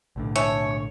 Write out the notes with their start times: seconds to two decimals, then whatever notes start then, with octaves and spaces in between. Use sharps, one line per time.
0.16 B1 A2 D3
0.36 C#5 E5 G#5 A5
0.71 C#6